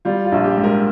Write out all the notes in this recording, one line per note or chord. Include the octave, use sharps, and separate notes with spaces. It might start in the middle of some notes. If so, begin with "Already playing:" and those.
G3 F4
F4
A#1
G4
G#2
A#4